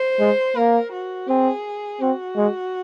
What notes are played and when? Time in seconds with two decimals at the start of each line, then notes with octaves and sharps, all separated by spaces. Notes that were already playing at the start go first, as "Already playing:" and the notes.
Already playing: C5
0.19 G#3
0.56 A#3 A#4
0.92 F#4
1.28 C4 G#4
2.00 C4 F#4
2.36 G#3